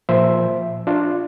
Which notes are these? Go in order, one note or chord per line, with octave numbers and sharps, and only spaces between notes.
A#2 F3 C5 E5
D4 F4